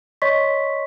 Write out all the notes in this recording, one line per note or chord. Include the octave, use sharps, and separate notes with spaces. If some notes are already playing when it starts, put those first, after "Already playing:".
C#5 D#5 C6 C#6 B6